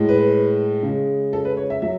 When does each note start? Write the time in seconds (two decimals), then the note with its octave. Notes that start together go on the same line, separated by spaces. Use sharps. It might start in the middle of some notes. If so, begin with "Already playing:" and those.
Already playing: A2 G#3
0.09 B4
0.83 C#3 G#3
1.33 A4
1.45 B4
1.57 C#5
1.70 E5
1.82 F#3 E5